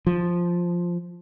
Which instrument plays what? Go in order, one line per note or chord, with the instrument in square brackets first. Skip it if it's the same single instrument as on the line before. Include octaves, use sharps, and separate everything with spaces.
[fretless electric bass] F3